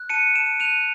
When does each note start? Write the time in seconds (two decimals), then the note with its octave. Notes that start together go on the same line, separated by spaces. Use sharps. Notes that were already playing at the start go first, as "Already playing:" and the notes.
Already playing: F#6
0.09 A5 C#7 D#7
0.35 A5 D7 E7
0.60 F#6 D#7 F7